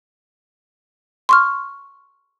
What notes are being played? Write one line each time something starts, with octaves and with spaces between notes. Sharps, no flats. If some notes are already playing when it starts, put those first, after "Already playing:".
C6 C#6 F6